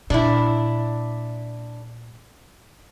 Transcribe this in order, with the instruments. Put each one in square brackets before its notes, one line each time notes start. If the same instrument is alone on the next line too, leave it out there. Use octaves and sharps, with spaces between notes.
[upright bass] A#2 [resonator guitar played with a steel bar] D4 E4